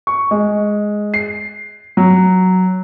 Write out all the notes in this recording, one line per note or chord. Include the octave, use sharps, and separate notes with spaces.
C#6
G#3
C7
F#3